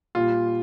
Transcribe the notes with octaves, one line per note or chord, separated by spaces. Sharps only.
A#2 G3 F4